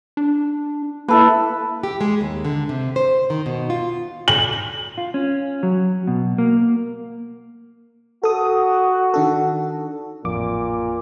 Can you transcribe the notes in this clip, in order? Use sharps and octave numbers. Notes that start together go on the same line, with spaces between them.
D4
A#3 E4 A4 B4
G4
G#3
D#2
D3
C3
C5
D#3
B2
F4
F#7
F4
C#4
F#3
B2
A#3
F#4 A4 D#6
D#3 D4 A4
A1 F2 A#2 D6